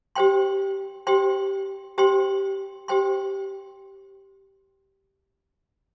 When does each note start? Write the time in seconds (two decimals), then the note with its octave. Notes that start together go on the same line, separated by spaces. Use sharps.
0.15 G4 C5 G5 C6
1.07 G4 C5 G5 C6
1.98 G4 C5 G5 C6
2.88 G4 C5 G5 C6